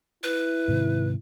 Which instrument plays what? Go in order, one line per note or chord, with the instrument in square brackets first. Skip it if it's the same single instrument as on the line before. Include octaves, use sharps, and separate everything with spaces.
[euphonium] E4 [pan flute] B4
[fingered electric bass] G#2 C3 D#3